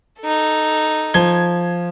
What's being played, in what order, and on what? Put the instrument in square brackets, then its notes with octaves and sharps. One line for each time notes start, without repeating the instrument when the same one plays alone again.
[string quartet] D#4 A4
[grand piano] F3 G#6 G7